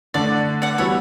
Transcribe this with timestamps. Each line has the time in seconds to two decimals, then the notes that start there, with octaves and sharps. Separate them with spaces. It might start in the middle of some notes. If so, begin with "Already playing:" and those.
0.14 D3 A3 D4 D5
0.62 D5 F#5
0.78 E3 G3 B3 F#4 C#5 E5